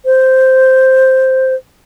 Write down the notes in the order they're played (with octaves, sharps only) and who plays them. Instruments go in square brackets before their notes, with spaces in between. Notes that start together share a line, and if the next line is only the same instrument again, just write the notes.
[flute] C5